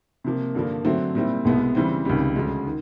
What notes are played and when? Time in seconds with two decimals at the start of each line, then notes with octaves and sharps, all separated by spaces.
0.24 C3 F3 A#3
0.55 G2 D3 F3 A#3
0.85 D3 F#3 A3 C4
1.15 A#2 G3 C4 E4
1.45 C2 B2 G#3 B3 E4
1.75 C#3 E3 G3 C4
2.05 C#2 C3 D#3 G3
2.36 D2 C#3 F3 G#3
2.66 D#3